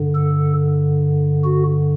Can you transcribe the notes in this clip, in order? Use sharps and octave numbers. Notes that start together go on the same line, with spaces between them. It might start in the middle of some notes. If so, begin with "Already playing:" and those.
Already playing: G2 D3
A4
F#4